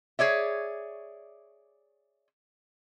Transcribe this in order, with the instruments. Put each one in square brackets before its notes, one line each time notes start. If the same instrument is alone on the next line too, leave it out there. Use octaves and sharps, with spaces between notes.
[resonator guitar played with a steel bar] G#4 C#5 D5 E5